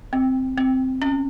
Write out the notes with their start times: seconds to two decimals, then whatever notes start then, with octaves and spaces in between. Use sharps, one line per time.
0.13 C4
0.58 C4
1.02 C#4